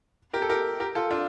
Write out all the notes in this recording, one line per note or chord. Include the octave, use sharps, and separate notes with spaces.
G4 A#4
A4
G4 A#4
G4 A#4
F4 A4
D4 F4